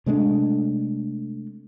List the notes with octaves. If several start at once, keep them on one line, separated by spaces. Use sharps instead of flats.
C3 G#3 A3 D4